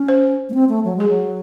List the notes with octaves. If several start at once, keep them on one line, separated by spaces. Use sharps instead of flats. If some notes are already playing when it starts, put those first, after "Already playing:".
Already playing: C#4
C5
A3
C4
A3
F#3
G#3 G#4
F#3